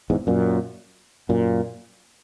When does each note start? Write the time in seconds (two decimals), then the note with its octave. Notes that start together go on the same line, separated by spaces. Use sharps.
0.10 E2 G#2
0.27 F#2 A#2
1.29 F#2 A#2